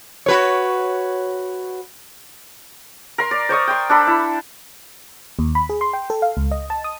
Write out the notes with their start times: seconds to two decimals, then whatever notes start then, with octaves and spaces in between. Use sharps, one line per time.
0.26 F#4 B4 C#5
3.18 A#4 C6
3.31 D5
3.49 C5 D5 C#6 D#6
3.67 G5 C6
3.89 D4 A4 B5
4.07 E4
5.39 D#2
5.55 B5
5.69 G#4
5.81 C6
5.93 G5
6.10 A4
6.22 F5
6.37 C#2
6.51 D#5
6.70 A5
6.84 D#6